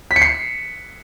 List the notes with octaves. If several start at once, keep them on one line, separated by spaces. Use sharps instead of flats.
B6
C#7
C7